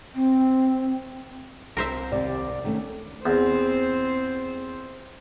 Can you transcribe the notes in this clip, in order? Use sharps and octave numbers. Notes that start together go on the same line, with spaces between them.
C4
C2 A#4 C5 E5
D#2 C3 D5
D#3 A3 C#4
E2 C4 C5